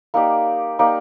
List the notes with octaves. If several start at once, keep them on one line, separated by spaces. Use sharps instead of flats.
A#3 D#4 G4 D5
A#3 D#4 G4 D5